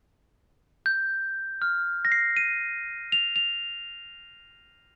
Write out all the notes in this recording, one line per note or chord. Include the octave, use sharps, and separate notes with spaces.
G6
F6
A#6
C7
D#7
F7
F7